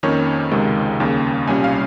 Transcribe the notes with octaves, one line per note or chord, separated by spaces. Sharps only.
F2 D#3 A#3 C#4 C#5
C#2 C3 D#3 G#3
D#2 C#3 G3 A#3
C2 A#2 G3 C#4 G#5
F5